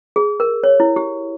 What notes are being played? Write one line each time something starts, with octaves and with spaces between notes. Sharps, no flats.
G#4
A#4
C#5
E4
G4